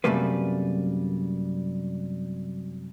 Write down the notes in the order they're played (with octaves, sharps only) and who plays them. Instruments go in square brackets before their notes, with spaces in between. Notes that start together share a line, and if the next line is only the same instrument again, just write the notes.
[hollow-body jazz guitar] F#2 C3 G3 A3 A#3 B4